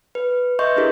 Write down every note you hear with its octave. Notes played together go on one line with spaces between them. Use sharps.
B4
B4 D#5 E5 C6 C#6 G6
D4 E4 G4 G#4 A#4